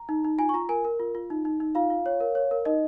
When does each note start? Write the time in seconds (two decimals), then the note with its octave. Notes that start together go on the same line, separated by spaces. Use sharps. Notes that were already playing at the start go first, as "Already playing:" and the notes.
Already playing: A#5
0.09 D#4
0.24 D#4
0.38 F4 G#5
0.49 C#6
0.54 F4 A#5
0.69 A#4 G#5
0.85 A#4
1.00 F4
1.15 F4
1.30 D#4
1.45 D#4
1.60 D#4
1.75 F4 F5
1.90 F4
2.06 C#5
2.20 A#4
2.35 C#5
2.51 A#4
2.65 D#4 D#5